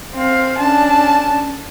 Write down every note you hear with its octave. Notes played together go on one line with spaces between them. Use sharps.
C4 F5
C#4 D4 A5